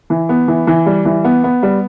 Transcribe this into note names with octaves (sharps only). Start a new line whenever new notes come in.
E3
B3
E3
E3
G3
E3
B3
B3
G3